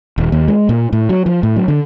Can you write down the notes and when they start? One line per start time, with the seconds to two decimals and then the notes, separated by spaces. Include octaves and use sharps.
0.18 D#1
0.32 D#2
0.48 G#3
0.69 A#2
0.93 A2
1.09 F#3
1.26 F3
1.43 A2
1.56 F#3
1.68 D3